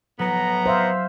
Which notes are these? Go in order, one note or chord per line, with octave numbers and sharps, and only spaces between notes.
A2 F#3 B3 A#5
C5 E5 F5